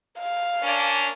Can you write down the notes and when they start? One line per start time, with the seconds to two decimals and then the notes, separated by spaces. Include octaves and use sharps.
0.19 F5
0.61 A#3 C#4 D4